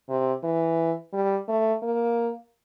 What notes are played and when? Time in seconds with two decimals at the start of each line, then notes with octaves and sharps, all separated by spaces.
0.09 C3
0.43 E3
1.13 G3
1.49 A3
1.82 A#3